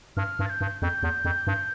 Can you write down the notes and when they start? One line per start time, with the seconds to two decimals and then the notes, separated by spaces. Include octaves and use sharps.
0.17 G2 F6
0.39 G2
0.45 A6
0.50 G6
0.61 G2
0.82 F2 G6
1.03 E2
1.25 F2
1.47 G2